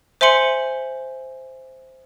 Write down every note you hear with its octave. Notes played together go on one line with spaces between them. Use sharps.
C5 E5 G#5 C6 C#7 F#7